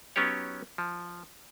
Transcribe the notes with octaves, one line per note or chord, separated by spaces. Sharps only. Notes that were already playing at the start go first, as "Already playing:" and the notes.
F#3 B3 C#4 D#4 G4 C#5
F3